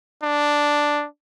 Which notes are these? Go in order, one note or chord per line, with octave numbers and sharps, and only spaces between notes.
D4